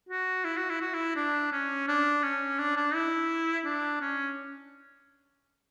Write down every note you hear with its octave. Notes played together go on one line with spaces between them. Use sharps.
F#4
E4
F#4
E4
F#4
E4
D4
C#4
D4
C#4
D4
D4
E4
D4
C#4